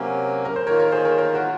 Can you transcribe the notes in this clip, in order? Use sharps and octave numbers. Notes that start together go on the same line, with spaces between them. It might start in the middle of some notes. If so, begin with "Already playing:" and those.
Already playing: C3 F#3 A#3 C#4
A#4
C5
D#3 A#3 F4 A#4 C#5
A#4 C#5
G#4 C5
A#4 C#5
A#4 C#5
F#4 A#4